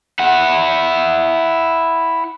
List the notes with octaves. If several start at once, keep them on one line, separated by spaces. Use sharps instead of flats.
E4 F#5